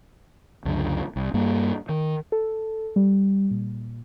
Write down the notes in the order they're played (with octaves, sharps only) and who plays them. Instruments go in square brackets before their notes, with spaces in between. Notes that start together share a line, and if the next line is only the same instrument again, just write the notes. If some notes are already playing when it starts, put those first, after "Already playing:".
[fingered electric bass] C#2 F#2 D3
C2
G2 G3 A#3
D#3
[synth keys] A4
G3
A#2